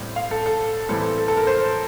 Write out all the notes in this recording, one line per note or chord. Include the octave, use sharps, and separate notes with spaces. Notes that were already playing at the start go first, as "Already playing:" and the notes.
Already playing: A2 G3 C4
F5
A4
A4
A2 E3 G3 C4 A4
A4
A4
A#4
C5